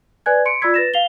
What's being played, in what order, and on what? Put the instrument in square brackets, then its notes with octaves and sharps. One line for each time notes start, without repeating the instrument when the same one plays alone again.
[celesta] B4 D5 G#5 F#6 G#6
C6 C#7 D7
F4 D5 B5 E6 G#6 B6
B4 A6 A#6 E7
F5 C7 F7 G7